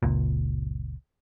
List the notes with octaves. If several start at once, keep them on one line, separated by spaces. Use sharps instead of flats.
F#1 C#2 A#2